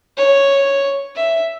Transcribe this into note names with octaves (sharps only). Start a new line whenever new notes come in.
C#5
E5